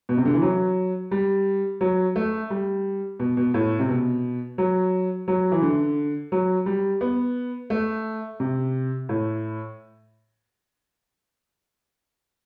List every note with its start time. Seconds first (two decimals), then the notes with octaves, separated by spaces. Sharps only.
0.09 B2
0.17 C3
0.25 D3
0.34 E3
0.42 F#3
1.11 G3
1.81 F#3
2.16 A3
2.50 G3
3.20 B2
3.37 B2
3.54 A2
3.79 C3
3.89 B2
4.58 F#3
5.28 F#3
5.52 E3
5.62 D3
6.32 F#3
6.66 G3
7.01 B3
7.70 A3
8.40 C3
9.09 A2